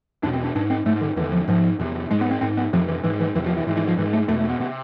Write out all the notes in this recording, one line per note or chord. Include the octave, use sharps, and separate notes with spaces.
E2 B2 D4
C4
D4
G#2 D4
C4
G#2 A3
D3
E2 D3 E3
F3
G#2 F3
E2 C3
G#2 G#3
B3
C4
G#2 C4
B3
F2 C3 F3
E3
G#2 E3
E3
E2 C3 E3
F3
E3
G#2 E3
E3
F3
G#2 E3
A3
E2 B2 A3
A3
B3
C3 B3